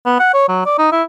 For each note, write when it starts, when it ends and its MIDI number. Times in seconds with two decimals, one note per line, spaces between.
0.06 0.19 59
0.19 0.31 78
0.34 0.48 73
0.49 0.66 54
0.66 0.76 74
0.78 0.89 63
0.92 1.03 64